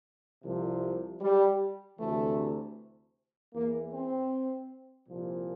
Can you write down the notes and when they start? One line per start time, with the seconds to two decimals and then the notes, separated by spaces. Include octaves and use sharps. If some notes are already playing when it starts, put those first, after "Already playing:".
0.44 C2 C3 F3
1.21 G3
1.98 D2 C3 E3 A3
3.54 E2 E3 A#3
3.92 C4
5.08 C2 A#2 F3